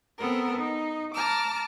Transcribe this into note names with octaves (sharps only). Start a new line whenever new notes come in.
B3 C4 A4 A#4
D#4
A5 A#5 D6 F6